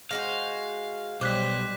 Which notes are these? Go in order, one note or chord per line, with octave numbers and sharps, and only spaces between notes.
G#3 F#4 C5 F5
B1 G3 C5 D6 F#6 B6